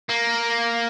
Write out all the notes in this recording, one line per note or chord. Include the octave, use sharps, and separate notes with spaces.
A#3